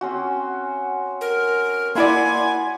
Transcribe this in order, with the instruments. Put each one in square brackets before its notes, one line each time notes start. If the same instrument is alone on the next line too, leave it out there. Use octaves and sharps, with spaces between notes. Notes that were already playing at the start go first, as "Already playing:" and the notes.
[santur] C4 C#4 F#4
[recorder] A#4
[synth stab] A#3 E4 D5 [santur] F#5 B5 C6 [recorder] G#5